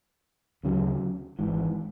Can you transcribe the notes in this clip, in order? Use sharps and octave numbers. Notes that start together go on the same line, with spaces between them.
D2 C#3 F#3
G#1 G#2 E3